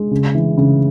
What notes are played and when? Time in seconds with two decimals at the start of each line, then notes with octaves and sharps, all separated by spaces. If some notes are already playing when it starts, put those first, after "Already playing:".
Already playing: G#3
0.11 C#3
0.35 E3
0.57 C#3